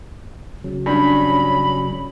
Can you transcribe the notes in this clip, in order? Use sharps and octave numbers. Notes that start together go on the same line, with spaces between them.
C#3 F#3
G2 C#4 B5